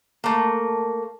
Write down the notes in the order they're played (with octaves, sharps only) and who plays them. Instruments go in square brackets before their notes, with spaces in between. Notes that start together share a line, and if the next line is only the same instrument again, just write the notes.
[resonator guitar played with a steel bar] A3 A#3